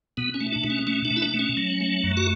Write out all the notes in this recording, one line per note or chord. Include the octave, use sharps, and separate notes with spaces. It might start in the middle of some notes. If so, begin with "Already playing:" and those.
B2 B3
C#4
A3
D4
B2
C#4
A3 C#4
D4
B2
E4
D4
A3
C#4
F#3
A3
F#2
F#4